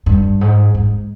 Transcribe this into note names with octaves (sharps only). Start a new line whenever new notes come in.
G2
G#2
G#2